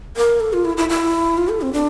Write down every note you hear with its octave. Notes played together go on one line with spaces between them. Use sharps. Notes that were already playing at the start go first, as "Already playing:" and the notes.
A#4
A4
F4
E4
E4
E4
F4
A4
C4
D4